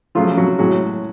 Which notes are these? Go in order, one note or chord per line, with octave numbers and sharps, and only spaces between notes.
C#3 F3 F#3 A3 F4
F#3 F#4
A2 F#3 G#3 F#4